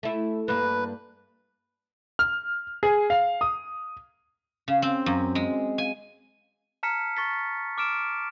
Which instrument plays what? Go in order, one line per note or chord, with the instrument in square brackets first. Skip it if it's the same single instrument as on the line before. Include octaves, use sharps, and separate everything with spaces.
[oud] A3 E4
[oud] G2 A#3 [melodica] B4
[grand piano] F6
G#4
F5
D#6
[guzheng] C#3
C4
F#2
G#3
G#5
[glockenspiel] A5 A#5 F6 B6 C#7
C#6 A6 B6
D6 F6 D7 E7